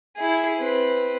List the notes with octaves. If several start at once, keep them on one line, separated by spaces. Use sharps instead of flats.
E4 G#4
C4 B4